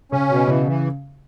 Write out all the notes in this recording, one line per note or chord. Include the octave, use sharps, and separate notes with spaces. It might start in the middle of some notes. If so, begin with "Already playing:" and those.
C#3 C#4
B2
C#3 E3
E3